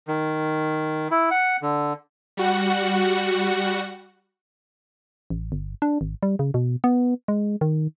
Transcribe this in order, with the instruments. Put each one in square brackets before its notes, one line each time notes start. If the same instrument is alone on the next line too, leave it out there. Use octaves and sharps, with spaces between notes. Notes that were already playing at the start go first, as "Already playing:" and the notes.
[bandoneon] D#3
E4
F#5
D3
[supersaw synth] G3 F#4 F#5
[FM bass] A1
G1
D4
G#1
G3
C#3
B2
B3
G#3
D#3